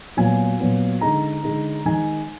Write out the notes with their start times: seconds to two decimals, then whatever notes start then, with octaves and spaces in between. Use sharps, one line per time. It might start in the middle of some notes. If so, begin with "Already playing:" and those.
0.17 A#2 F#3 B3 G#5
0.60 A#2 F#3 B3
1.01 D3 G#3 D#4 A#5
1.43 D3 G#3 D#4
1.85 D#3 G#3 D#4 G#5